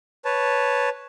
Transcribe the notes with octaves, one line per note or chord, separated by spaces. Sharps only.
B4 C#5 A5